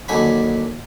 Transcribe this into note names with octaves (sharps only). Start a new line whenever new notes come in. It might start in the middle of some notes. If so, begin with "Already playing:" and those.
D#2 D3 F#3 G#5 B5